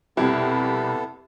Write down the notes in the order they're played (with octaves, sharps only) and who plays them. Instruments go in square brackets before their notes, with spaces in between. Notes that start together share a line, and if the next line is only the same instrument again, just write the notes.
[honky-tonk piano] C2 F2 G4 [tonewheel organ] B2 B5 [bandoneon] B3 A4 [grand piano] E4